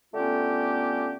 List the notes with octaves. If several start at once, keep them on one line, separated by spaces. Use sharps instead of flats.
D3 A3 B3 C#4 F4 G4